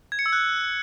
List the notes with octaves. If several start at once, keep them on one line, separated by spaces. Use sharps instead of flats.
G#6
C#7
E6
F#6